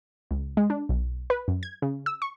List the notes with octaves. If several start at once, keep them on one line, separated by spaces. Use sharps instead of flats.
C#2
G#3
D4
B1
B4
F#2
G#6
C#3
E6
C#6